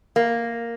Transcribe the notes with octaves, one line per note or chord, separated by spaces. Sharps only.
A#3